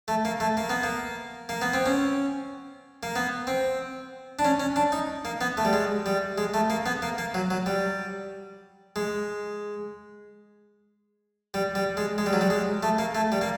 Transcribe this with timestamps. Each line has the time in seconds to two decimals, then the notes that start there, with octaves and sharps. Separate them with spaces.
0.08 A3
0.25 A#3
0.40 A3
0.57 A#3
0.69 B3
0.83 A#3
1.49 A#3
1.62 B3
1.74 C4
1.86 C#4
3.03 A#3
3.16 B3
3.47 C4
4.39 D4
4.45 C#4
4.60 C#4
4.76 D4
4.92 D#4
5.25 A#3
5.41 B3
5.57 A3
5.65 G3
5.73 G#3
6.06 G3
6.38 G#3
6.54 A3
6.70 A#3
6.86 B3
7.02 A#3
7.18 A#3
7.34 F#3
7.51 F#3
7.66 G3
8.96 G#3
11.54 G3
11.75 G3
11.97 G#3
12.18 G#3
12.26 G3
12.33 F#3
12.41 G3
12.50 G#3
12.83 A3
12.99 A#3
13.15 A3
13.32 G3
13.41 A#3